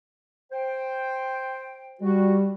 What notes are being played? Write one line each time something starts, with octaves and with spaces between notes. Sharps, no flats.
C5 G5
G3 F#4